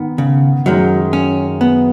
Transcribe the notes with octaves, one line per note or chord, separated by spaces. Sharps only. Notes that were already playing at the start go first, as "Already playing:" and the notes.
Already playing: G#2 D#3 B3
C#3
F#2 D#3 F#3 G#3
C#4
B3